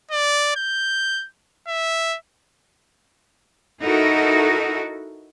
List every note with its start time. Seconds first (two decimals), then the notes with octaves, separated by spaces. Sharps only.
0.11 D5
0.56 G6
1.67 E5
3.82 D#4 E4 F#4 A4 A#4